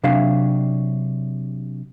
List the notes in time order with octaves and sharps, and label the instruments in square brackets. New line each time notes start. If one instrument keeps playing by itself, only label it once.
[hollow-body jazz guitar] C3 F#3 D4 E5 F5